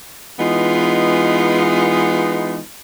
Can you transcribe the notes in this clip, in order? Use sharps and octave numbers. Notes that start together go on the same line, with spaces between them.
E3 G#3 B3 D#4 F4